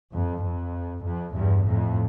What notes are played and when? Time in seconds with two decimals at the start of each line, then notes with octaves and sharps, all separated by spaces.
0.13 F2
0.43 F2
1.04 F2
1.35 E2 G2
1.66 F2 A2